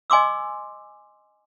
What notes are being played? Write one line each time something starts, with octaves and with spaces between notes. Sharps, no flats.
D#5 G#5 C6 D6 E6